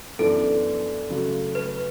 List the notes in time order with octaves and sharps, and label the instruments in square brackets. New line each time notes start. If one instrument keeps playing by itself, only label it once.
[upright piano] F#2 E3 B3 D4 [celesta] A4
[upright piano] C#3 F#3 A3
[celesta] B4